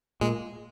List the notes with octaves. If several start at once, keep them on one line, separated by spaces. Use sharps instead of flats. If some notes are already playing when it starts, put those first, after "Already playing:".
A#2 G#3